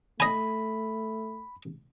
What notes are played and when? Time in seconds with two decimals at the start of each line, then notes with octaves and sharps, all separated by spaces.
0.20 A3 D#5 G#5 B5